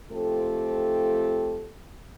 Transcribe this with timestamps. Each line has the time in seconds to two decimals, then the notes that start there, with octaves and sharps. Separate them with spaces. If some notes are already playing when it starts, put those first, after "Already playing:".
0.11 F3 A3 C4 F4 G4 A4